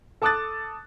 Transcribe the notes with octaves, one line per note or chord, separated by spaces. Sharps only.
A4 A5 D6 D#6 F#6 A6